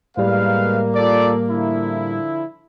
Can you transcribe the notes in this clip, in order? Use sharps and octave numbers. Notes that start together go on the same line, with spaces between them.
A2 G3 G#3 A#3 B4 F5
F4 A4 D5
D3 F3 E4